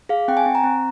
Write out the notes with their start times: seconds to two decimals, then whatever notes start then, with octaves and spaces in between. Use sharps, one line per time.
0.09 G#4 F5
0.28 C4 G5
0.37 G#5
0.46 C4
0.55 A#5
0.64 C4